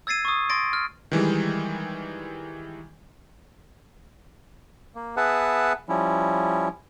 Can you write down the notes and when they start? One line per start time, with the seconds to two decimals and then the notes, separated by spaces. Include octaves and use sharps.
0.07 E6 G#6 A6 C7 D#7
0.25 C#6 D#6
0.50 C6 D#6 A6 A#6 D7
0.73 F6
1.11 D#3 E3 G3 G#3
4.95 A#3
5.17 B3 G#4 B4 E5 F#5 A5
5.89 F3 G3 C#4 E4